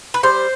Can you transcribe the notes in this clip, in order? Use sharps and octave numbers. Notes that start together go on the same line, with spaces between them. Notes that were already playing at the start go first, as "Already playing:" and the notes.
B4
G3 C5